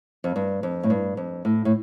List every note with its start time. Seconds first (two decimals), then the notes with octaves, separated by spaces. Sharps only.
0.24 F2
0.36 G2
0.63 F2
0.83 A2
0.90 G2
1.17 F2
1.45 A2
1.65 A2